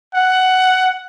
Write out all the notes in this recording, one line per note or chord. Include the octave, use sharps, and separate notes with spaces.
F#5